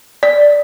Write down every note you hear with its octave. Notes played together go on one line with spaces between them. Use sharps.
D5